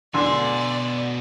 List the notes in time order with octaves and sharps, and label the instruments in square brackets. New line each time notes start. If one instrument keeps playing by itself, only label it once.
[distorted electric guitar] B2 G#5 [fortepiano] D3 [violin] D5 [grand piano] C6 E6